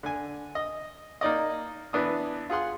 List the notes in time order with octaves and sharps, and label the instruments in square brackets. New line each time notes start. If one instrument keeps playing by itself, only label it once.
[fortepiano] D3 G#5
D#5
A#3 D#4 D5 D#5
E3 B3 D4 D#6
F4 G#4 F#5 C6